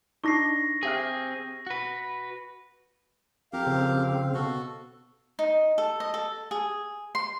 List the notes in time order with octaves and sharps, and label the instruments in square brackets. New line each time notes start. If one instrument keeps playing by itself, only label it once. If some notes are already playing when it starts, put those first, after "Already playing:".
[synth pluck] D4 D#4 [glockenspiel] C#6 A#6 C7
[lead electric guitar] C4 G#4 [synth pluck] G4 E5 F6
[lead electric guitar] F#4 B4
[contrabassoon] F2 [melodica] G4 A#4 [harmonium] F5
[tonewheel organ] C#3 C4
[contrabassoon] B2 [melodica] F#4 A4
[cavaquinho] D#4
A4
D#5
A4
G#4
C6